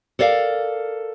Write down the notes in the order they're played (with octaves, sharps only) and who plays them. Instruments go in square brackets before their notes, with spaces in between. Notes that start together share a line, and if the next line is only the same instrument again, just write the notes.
[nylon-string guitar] A4 A#4 D5 F5